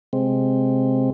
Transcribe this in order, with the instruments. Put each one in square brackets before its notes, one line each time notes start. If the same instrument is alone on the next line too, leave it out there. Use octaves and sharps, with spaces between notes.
[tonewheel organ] C3 G#3 C4